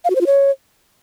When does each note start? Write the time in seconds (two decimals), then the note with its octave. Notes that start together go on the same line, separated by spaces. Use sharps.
0.05 F5
0.10 F#4
0.15 C5
0.21 F4
0.26 C#5